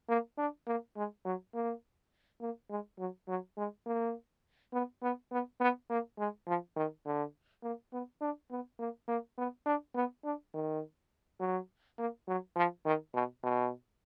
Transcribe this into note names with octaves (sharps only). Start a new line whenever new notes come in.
A#3
D4
A#3
G#3
F#3
A#3
A#3
G#3
F#3
F#3
G#3
A#3
B3
B3
B3
B3
A#3
G#3
F3
D#3
D3
A#3
B3
D4
B3
A#3
A#3
B3
D4
B3
D4
D#3
F#3
A#3
F#3
F3
D#3
B2
B2